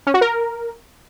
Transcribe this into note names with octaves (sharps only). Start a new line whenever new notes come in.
C#4
F#4
A#4